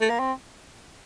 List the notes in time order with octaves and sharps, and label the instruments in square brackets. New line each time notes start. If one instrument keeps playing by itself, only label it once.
[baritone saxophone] A3
A#3
C4